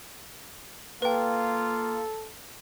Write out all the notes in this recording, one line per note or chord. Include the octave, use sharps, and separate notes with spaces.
A#3 F4 A4 B4 G5